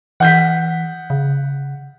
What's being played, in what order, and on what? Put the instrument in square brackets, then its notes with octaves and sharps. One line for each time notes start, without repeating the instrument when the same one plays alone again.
[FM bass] E3 [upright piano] F#5 G6 B6
[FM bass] C#3